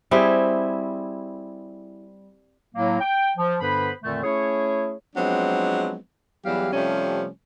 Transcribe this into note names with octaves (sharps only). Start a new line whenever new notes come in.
G3 C4 E4 G#4
A2 F#3 A#3
G5
F3
G2 D3 B3 B4 C5 B5
F2 A#2 D3 D#3 A3
A3 C#4 E4 G#4 C#5
F3 F#3 G#3 B3 C4 D4
E2 E3 F#3 G3 G4 F5
C3 F3 G3 A3 C4 C#4